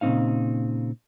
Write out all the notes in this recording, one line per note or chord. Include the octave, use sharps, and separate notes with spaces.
A#2 C#3 F3 C4 D#4 F5